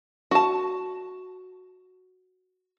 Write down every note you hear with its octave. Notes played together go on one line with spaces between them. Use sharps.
F#4 A5